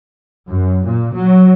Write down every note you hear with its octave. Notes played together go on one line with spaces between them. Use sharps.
F#2
A#2
F#3